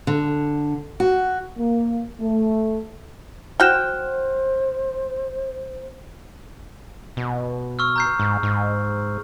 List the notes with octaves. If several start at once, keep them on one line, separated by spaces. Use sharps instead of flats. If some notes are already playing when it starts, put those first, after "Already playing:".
D3
F#4
A#3
A3
F#4 C5 G5 F6 F#6 E7
B2
C#6 E6 F6
A#5 G6 C7
G#2
G#2